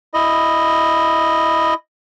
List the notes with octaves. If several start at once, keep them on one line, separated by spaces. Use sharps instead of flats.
E4 D#5